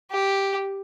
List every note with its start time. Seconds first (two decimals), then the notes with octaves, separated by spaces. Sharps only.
0.11 G4